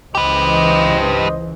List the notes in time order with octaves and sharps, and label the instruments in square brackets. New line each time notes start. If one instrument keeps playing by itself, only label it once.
[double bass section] C#2 E3 [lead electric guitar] G4 B4 [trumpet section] C5 D#5